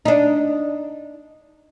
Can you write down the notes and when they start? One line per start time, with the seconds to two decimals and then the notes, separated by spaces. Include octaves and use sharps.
0.05 D4 D#4